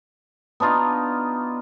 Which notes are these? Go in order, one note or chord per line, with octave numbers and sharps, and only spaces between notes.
B3 D4 D#4 F4